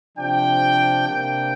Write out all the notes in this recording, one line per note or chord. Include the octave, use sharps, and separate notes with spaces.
C3 F3 D4 G5
C3 A#3 D4 G5